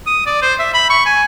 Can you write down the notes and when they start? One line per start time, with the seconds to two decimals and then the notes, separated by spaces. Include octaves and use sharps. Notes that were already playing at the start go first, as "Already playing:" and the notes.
0.07 D#6
0.26 D5
0.42 C5
0.59 E5
0.74 B5
0.90 C#6
1.06 G#5